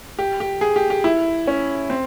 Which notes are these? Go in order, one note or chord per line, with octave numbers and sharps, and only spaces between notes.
G4
G4
G#4
G4
G4
E4
C#4
C4